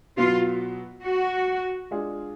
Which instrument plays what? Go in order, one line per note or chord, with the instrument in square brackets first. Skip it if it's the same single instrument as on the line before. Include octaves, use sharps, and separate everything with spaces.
[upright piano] B2 F#3 B3 [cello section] F4
[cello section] F#4
[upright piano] G#3 D4 F4 G#4